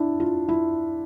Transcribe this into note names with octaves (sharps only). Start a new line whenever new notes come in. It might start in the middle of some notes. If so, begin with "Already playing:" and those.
Already playing: D4 E4
F4
E4